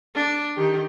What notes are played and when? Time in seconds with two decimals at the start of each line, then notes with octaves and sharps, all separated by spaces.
0.15 D4
0.56 D#3 G4